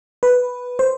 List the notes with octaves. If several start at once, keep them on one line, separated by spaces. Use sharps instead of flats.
B4
C5